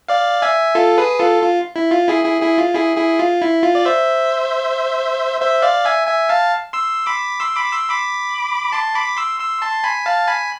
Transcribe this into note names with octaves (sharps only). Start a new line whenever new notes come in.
D5 F5
E5 G#5
F4 A4
G#4 B4
F4 A4
F4
E4
F4
E4 G#4
E4 G#4
E4 G#4
F4
E4 G#4
E4 G#4
F4
E4
F4
D5
C5 E5
C5 E5
D5 F5
E5 G#5
E5 G#5
F5 A5
C6 E6
B5 D6
C6 E6
B5 D6
C6 E6
B5 D6
A5 C6
B5 D6
C6 E6
C6 E6
A5 C6
G#5 B5
F5 A5
G#5 B5